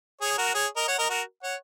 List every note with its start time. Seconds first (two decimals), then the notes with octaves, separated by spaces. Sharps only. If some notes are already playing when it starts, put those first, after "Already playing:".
0.21 G#4 C#5
0.38 F#4 A#4
0.55 G#4 C#5
0.77 A#4 D#5
0.88 C#5 F#5
0.98 A#4 D#5
1.10 F#4 A#4
1.43 C#5 F#5